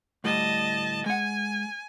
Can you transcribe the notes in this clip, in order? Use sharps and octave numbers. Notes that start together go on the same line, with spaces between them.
D2 A2 G3 D#5 A5
G#3 F#5 G#5